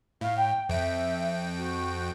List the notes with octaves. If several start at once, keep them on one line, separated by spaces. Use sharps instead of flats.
A2 F5
G5
F2 E5 G5
F#4